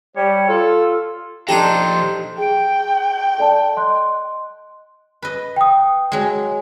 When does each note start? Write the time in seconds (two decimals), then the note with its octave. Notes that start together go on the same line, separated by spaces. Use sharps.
0.16 G3 C#5
0.48 F4 A4
1.49 F3 D4 D#4 G4 A4 C5 A#5
2.38 G#4 G5 D7
3.38 A4 D5 A5
3.76 D#5 C6 F#6
5.22 B4 D#5
5.56 G5 D#6
6.12 F#3 G#3